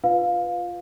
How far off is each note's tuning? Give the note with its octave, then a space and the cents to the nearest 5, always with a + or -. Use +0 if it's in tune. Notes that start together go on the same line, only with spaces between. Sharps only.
F4 +0 B4 +0 F5 +15